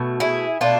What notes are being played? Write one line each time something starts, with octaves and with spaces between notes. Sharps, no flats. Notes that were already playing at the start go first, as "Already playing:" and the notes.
Already playing: B2 A3
E4 G#4
B2 A3 D4 F4